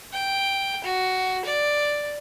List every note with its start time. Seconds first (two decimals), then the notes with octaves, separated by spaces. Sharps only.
0.12 G5
0.84 F#4
1.45 D5